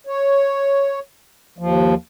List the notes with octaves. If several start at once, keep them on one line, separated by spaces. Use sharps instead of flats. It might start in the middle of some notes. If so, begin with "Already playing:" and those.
C#5
D#2 F3